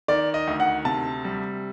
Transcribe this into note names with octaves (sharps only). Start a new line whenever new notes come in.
D#3 D5
D#5
D2
F#5
C3 A5
G3